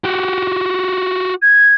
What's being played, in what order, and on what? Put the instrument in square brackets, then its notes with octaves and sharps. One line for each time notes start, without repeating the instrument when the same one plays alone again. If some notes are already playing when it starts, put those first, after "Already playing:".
[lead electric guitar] F#4 G4
[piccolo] G#6